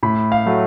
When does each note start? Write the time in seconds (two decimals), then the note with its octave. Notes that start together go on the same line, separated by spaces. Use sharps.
0.03 A2 B5
0.32 F5
0.46 F#3 A3